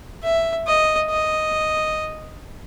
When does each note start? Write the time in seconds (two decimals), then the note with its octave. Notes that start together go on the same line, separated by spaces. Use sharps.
0.23 E5
0.67 D#5
1.10 D#5